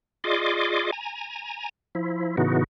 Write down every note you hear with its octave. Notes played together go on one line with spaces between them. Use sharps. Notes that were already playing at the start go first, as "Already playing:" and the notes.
F4 G#4 D5 D#5 C6 D6
G#5 A#5
F3 E4
A2 C#3 E3 B3 D#4 F#4